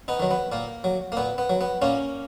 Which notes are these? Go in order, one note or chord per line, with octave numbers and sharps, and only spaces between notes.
B3 D#4
D#3 F#3
B3
A#2 A#3
F#3
A#3
A#2 B3
B3
F#3
B3
A#2 A#3 C#4